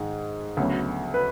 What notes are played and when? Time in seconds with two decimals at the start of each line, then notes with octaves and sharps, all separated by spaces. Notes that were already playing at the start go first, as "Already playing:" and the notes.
Already playing: G#2 D#3 G#3
0.57 D2 C#3 F#3 B3
1.14 B4